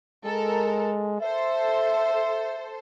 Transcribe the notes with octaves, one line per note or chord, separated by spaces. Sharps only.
G#3 A4 A#4
A4 C5 E5